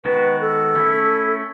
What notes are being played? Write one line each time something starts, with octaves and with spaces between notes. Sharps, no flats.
D#3 G#3 B3 F#4 B4
A4
A3 C#4 E4